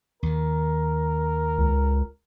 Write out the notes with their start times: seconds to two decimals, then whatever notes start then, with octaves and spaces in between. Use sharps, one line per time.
0.23 D#2 D#3 A#4
1.58 C#2